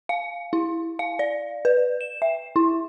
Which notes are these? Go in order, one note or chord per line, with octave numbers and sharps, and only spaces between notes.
F5
E4
F5
D5
B4
E7
E5
E4